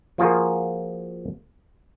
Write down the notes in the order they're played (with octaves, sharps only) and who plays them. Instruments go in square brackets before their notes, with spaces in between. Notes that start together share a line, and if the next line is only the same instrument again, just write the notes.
[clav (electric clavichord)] F3 A#3 F4 F#4 G#4 A#4